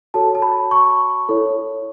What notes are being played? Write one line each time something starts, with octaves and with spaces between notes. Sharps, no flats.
F#4 A4 C#5 A5
A5
B5
C#6
E4 A4 C#5